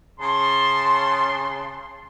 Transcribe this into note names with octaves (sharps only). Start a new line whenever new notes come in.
C#3 A5 C6